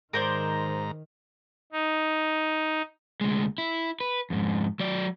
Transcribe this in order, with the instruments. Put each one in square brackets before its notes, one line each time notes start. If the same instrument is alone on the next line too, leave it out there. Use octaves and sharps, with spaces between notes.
[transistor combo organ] G#2 A#5 [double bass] D#3 [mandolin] A#4 C5 D5
[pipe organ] D#4
[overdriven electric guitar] D2 G#3
E4
B4
F2 G#2
F#3 D5